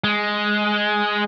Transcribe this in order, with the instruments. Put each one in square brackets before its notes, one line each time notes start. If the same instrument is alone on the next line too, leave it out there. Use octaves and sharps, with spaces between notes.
[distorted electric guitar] G#3